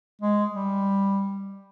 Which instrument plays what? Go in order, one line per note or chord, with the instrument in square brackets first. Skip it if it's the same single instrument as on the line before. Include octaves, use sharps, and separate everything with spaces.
[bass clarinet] G#3
G3